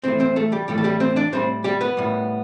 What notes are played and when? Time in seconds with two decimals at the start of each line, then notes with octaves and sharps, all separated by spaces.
0.04 A2 E3 A3 C4 C5
0.20 C4 C5
0.36 A3 A4
0.52 G3 G4
0.68 A2 E3 G3 A3 G4
0.78 A4
0.84 G3 G4
1.00 C4 C5
1.16 D4 D5
1.32 A2 G3 C4 C5
1.64 G3 G4
1.81 B3 B4
1.97 A2 G3